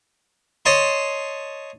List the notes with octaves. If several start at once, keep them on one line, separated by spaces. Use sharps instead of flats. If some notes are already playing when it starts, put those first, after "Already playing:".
C#5 D#5 A5 C6